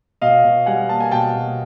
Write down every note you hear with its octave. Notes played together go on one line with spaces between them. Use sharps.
B2 D#5 F5
B2
G3 F#5 G#5
A#3 A5
G#5
B2 G5 A5
B2